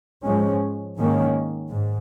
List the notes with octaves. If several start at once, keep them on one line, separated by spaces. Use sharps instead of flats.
G#2 F3 G#3 C#4
G#2 D#3 A#3 C#4
G#2